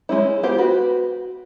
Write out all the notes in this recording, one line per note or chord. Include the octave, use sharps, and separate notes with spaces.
G#3 C#4 E4
B3 F4 G4 C5
F#4 B4